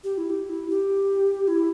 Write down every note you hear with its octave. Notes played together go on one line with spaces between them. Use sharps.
G4
E4
G4
E4
G4
E4